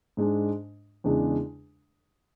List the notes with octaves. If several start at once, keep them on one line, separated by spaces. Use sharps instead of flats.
G#2 G#3 D4
E2 C#3 G#3 D4